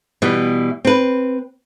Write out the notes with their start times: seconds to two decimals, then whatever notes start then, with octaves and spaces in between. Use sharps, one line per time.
0.22 B2 E3 G3
0.85 C4 B4